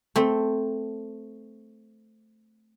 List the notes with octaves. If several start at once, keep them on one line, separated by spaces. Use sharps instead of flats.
A3 C4